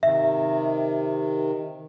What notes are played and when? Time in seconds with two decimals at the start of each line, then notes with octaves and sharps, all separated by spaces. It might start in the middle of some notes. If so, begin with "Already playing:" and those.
0.03 C3 D#3 E5